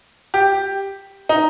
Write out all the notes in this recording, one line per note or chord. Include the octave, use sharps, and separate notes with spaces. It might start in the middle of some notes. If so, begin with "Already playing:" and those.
G4
D#4